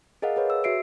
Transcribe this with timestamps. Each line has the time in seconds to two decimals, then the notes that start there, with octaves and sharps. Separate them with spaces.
0.22 G#4 A#4 D#5 F5 F#5
0.36 G#4 B4 C#5
0.50 E6
0.64 F#4 E5 C7 D7